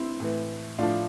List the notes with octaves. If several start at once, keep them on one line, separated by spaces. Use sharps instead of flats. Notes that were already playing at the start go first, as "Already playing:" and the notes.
Already playing: C4 E4
A2 E3
A2 F3 D4 F4